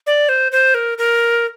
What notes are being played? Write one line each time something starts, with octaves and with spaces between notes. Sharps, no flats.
D5
C5
C5
A#4
A#4